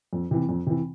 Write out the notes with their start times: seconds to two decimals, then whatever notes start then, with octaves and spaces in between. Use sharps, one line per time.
0.13 F2
0.31 C3 E3
0.49 F2
0.67 C3 E3